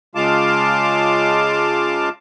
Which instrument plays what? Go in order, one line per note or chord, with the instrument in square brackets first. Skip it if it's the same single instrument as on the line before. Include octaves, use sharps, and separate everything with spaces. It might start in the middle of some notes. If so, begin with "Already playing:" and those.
[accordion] C#3 G#3 F4 F5 A5 D6